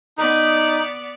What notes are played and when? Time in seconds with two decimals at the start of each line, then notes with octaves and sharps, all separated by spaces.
0.18 B3 D#4 D5